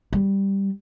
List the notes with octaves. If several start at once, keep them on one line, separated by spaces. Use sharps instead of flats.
G3